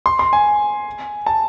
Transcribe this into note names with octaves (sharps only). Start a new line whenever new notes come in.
C6
C6
G#5
A5